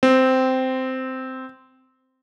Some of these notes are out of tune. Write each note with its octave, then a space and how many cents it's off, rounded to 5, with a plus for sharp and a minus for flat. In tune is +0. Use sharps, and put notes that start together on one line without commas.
C4 -10